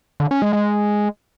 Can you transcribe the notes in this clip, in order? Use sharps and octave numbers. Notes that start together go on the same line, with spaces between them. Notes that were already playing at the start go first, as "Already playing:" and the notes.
D3
C#4
G#3
G#3